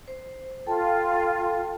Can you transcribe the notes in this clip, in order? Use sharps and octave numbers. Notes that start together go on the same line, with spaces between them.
C5
F4 A4 G5 A5